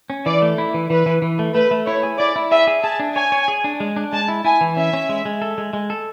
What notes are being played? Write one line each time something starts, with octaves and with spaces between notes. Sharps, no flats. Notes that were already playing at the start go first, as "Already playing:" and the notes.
C#4
E3 D5
A3
E4
E3
E3 B4
E3
E3
A3
A3 B4
A3
E4 C#5
G#4
E4 D5
E4
G#4 E5
G#4
G#4 A5
D4
C#5 G#5
C#5
G#4
D4
G#3
D4
G#3 A5
E4
E4 G#5
E3
C#4 E5
C#4
G#3
G#3
A4
G#3
G#3
A4